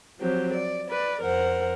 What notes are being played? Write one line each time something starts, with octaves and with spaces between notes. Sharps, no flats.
F3 F#3 C4 G4
D5
B4 D5
F2 A#4 C5 F#5